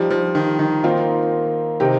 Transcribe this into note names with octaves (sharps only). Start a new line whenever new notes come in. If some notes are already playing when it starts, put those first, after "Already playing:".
Already playing: F3 G3 D#4 G4
F3
D#3
D#3
D#3 A#3 C4 F4 A#4
C3 D#3 C4 G4